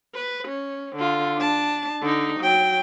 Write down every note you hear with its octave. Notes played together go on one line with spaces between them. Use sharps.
B4
C#4
D3 F4
D4 A5
D3 D#4
F#3 G5